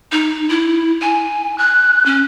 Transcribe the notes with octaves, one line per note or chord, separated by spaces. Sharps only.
D#4
E4
G#5
F#6
C#4